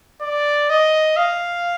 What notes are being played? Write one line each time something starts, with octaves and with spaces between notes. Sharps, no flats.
D5
D#5
F5